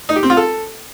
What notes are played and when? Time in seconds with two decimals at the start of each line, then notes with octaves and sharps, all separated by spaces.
0.09 D#4
0.16 G4
0.23 C4
0.30 F4
0.37 A4